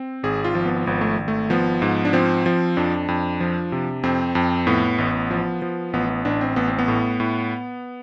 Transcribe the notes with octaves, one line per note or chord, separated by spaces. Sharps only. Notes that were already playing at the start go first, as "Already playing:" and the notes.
Already playing: C4
G#1 G#4
F4
F3
B3
G#1 B3
A3
G#1
A3
F3 B3
G#2
D4
F3 C4
F3
F2 D4
F2
F3
C3
F2 C4
F2
A2 B3
A1
F3
F3
A1 B3
B3
A1 D4
C4
A1 B3
C4
B3
A2
A2